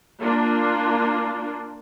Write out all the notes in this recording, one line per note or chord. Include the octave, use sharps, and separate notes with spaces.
A#3 D4 F4